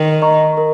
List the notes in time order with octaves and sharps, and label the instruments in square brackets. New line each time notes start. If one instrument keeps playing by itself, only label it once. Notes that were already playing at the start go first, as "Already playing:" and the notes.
Already playing: [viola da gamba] D#3 [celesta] A#4
[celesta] D#5 A#5 C#6
A#4